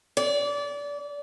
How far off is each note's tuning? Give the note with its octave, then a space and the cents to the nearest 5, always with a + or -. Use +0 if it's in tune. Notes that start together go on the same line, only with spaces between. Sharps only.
D5 -25